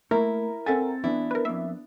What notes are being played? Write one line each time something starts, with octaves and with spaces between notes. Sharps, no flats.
A3 A#3 E4 A#4
C4 A4 E5 F#5 G#5 A6
E3 B3 D4 E4
A#4 B4
F2 A#3 E5